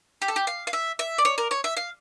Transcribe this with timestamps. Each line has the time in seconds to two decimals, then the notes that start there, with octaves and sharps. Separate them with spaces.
0.22 G4
0.28 A4
0.36 G4
0.47 F5
0.67 F5
0.73 E5
0.99 E5
1.18 D5
1.25 C#5
1.38 A#4
1.51 C#5
1.64 E5
1.77 F5